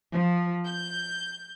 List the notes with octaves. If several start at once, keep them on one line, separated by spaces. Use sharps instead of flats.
F3
G6